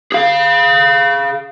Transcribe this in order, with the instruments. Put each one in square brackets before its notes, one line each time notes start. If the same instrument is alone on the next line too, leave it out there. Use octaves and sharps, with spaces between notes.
[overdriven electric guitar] G#4 F5